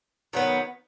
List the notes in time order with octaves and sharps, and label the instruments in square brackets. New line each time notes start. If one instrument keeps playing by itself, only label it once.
[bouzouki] D#3 F#3 B3